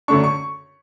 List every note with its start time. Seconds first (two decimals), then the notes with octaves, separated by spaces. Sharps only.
0.08 F#2 D3 A3 D4 C#6
0.24 C#6